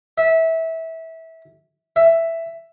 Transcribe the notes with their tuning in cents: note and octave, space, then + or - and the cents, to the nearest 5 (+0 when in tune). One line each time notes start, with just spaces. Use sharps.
E5 -20
E5 +5